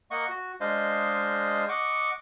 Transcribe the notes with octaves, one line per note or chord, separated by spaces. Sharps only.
A#3 D#5 F#5 C#6
F#4
G#3 D4 C5 D#5 F5
D#5 F#5 C#6 D6